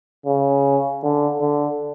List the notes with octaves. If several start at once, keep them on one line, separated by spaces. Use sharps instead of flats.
C#3
D3
D3